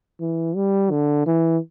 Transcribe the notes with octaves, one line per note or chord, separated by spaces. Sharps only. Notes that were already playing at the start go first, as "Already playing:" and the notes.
E3
G3
D3
E3